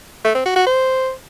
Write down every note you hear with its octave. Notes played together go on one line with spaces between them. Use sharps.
A3
C4
F#4
F#4
C5